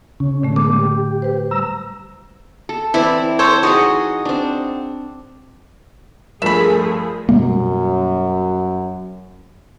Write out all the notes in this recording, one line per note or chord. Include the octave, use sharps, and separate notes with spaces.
C#3 C#4
A2 D3 A3
G#3 A#3 D6
G4
B4 C5
G3 A#5 E6
A4
E3 C4 E4 D5
A4 C5 C#5
D#4 F#4 G#4 C#5 D#5
C4 D4
G2 F3 A3 G#4 A#4 E5 B5
F#2 B2 G3 A#3